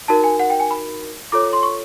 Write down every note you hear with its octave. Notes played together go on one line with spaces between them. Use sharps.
D#4 F#4 A#4 A5
G#5
F#5
G5
G#5
B5
F4 A4 C#5 D6
C6
C#6